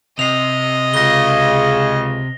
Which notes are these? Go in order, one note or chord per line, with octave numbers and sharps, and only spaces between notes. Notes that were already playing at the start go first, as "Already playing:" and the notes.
C3 D#5 C7 F7
C#2 C#3 A#6 G7